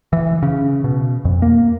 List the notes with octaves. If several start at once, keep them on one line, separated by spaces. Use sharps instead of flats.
E3
C#3
B2
F2
A#3